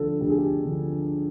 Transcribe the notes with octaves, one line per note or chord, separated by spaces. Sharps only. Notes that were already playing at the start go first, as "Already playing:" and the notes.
Already playing: D2 D3 F3 A4
D2 G4
G#4
G4
D3 F3